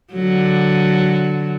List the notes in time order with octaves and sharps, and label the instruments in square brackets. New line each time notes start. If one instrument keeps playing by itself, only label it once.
[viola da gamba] D3 F#3